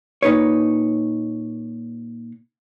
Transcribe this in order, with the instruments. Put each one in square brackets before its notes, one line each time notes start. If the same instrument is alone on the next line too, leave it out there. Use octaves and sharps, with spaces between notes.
[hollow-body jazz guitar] A#2 D#4 B4 C#5